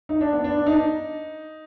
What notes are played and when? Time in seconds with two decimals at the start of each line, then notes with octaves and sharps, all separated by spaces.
0.09 D#4
0.21 D4
0.33 B3
0.44 D4
0.66 D#4